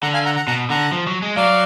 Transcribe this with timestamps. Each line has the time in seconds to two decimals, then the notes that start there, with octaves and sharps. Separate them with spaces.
0.02 D3 F#5 A#5
0.14 F5 G#5
0.25 F#5 A#5
0.36 F#5 A#5
0.47 B2 F#5 A#5
0.70 D3 F#5 A#5
0.92 F3
1.07 F#3
1.22 G#3
1.36 F#3 D5 F5